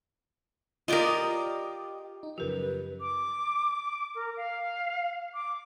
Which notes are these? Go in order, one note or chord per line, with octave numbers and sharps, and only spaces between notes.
F4 G4 A#4 D5 D#5
D#4
F#2 C#3 F3 G4 A#4 B4
D6
A#4
F5
D6